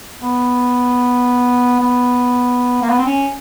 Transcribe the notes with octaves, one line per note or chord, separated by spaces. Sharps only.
B3
B3
A#3
B3
C4
C#4